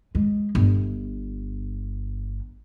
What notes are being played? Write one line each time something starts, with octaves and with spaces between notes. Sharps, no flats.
G#3
G1